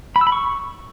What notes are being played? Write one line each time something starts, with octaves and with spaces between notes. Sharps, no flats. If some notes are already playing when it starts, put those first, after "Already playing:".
B5
E6
B5
C#6